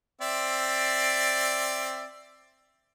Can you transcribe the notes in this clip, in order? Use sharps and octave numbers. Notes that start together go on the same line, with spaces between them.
C4 D5 E5